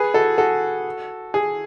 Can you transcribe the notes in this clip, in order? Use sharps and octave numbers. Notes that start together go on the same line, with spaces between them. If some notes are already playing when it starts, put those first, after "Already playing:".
Already playing: G#4 B4
F#4 A4
F#4 A4
G#4